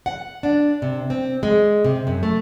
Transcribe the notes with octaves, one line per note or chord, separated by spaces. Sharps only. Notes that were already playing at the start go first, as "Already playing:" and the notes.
F#5
D4
C3
C4
G#3
C3
F#2
A3